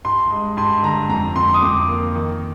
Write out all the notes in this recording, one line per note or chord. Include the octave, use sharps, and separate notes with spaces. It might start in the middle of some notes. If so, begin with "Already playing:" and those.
G2 C6
G#3
G2 C6
D3 A#5
F2 A#5
F2 C6
D#6
F2 D6
A#3
D#3